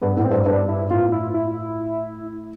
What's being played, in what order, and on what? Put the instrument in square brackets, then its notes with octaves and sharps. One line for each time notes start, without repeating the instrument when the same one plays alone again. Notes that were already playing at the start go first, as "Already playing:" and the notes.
[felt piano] G2 [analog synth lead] B3
[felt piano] A2 [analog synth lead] B3
[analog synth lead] C4
[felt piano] G2
[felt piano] G2 [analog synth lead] D4
[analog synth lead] E4
[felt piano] A2 [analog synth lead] F4
[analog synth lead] E4
E4